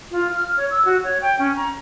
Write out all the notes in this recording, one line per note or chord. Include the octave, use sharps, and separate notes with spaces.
F4
F6
C#5
E6
F#4
C#5
G5
C#4
A#5